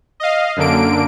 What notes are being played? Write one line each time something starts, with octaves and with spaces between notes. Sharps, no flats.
D#5 F5
F#2 D3 A#3 D7